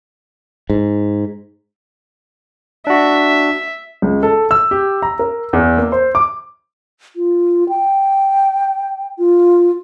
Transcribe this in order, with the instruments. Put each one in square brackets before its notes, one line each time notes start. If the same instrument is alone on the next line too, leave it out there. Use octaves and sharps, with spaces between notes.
[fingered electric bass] G#2
[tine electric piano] D4 F#4 [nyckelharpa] E5
[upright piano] C#2
A4
E6
G4
A#5
A#4
E2
A#3
C5
D6
[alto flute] F4
G5
F4